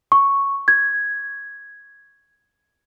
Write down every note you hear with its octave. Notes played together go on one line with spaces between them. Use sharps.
C#6
G#6